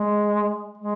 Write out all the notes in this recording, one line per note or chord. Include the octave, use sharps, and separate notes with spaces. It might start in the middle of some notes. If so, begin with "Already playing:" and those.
Already playing: G#3
G#3